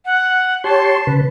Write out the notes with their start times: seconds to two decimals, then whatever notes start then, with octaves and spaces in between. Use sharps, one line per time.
0.05 F#5
0.64 G4 C#5 A5 C6
1.07 C#3 B4